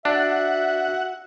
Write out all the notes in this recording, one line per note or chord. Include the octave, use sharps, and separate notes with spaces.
D4 F#4 E5 F#5